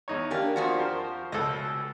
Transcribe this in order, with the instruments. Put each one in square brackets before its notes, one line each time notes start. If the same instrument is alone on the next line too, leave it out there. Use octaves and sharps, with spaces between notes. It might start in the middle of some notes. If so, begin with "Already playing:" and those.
[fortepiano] E2 D#4 C#5
[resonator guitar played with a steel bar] A#3 D4 G4 [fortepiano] A#4 G#5
[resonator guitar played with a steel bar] F2 F3 F#4
[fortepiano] G4 A#4 C5
[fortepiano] C#2 A4 [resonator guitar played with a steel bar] B2 D#5